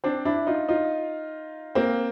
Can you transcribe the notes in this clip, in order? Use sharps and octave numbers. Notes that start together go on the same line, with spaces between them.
C4 D4
D4 E4
D#4 F4
D#4 F4
A#3 C4